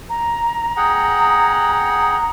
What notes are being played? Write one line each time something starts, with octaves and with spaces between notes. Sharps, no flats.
A#5
G#4 F#5 G5